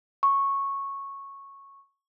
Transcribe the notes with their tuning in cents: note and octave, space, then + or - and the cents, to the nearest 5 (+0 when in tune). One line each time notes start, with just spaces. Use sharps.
C#6 -10